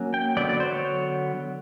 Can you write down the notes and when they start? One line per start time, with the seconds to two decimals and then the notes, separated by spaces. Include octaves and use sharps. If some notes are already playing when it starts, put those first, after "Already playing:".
Already playing: F#3 A#3 C#4
0.14 G5
0.37 D3 F#3 B3 D5
0.49 D5
0.60 C5
0.72 C#5